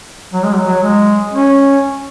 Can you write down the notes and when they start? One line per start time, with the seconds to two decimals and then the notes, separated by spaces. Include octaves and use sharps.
0.33 F#3
0.44 G#3
0.55 F#3
0.66 F#3
0.83 G#3
1.34 C#4